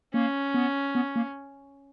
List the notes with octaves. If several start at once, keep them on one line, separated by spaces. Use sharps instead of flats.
A#3 C#4
B3
B3
A#3